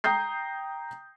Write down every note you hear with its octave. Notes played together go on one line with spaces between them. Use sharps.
G5 A#5 D#6 G6 C7